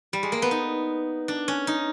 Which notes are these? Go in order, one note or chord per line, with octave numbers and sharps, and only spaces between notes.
G3
G#3
A#3
B3
D#4
D4
C#4
D#4